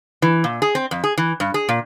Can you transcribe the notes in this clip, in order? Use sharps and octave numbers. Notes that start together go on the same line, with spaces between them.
E3
A#2
G#4
C4
F2
G#4
E3
G2
G#4
A#2